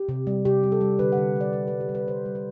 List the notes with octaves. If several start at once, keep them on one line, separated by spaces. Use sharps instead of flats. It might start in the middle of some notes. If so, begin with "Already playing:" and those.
Already playing: G4
C3
G3
C3 G4
G3
A4
G3
D3 B4
F#5
D3
D3 D5
D3 B4
G3 B4
G4
G3
B4
D3 C5
G3
B4